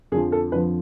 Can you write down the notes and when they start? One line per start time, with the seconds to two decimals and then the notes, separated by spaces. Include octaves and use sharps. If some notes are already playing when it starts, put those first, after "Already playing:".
0.12 F2 D3 F3 G#4
0.32 A4
0.52 F2 D3 F3 B4